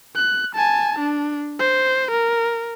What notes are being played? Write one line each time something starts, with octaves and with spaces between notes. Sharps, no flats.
F#6
G#5 A5
D4
C5
A#4